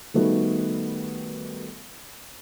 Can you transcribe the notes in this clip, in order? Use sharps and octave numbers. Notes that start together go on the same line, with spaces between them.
D#3 G3 A3 B3 F#4 A4